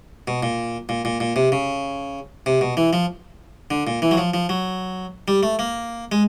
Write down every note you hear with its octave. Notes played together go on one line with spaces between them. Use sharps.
B2
A#2
A#2
A#2
A#2
C3
C#3
C3
B2
E3
F3
D3
A#2
E3
F#3
F3
F3
F#3
G3
A3
A#3
G#3